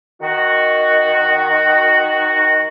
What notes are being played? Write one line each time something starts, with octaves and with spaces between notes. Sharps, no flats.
D#3 F#4